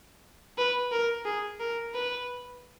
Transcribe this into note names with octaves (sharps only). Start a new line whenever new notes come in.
B4
A#4
G#4
A#4
B4